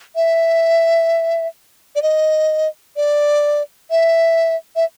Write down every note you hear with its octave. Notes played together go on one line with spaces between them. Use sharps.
E5
D5
D#5
D5
E5
E5